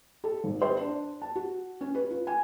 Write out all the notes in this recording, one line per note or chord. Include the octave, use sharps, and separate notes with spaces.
A4
G#1
C5
D4
A5
F#4
C#4
B4
F4
G#5